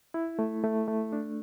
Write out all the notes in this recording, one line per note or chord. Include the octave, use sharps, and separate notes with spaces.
E4
A3
A3
A3
D4